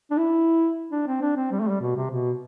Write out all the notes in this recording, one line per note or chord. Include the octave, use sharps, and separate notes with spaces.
D4
E4
D4
C4
D4
C4
G3
A3
G3
B2
C3
B2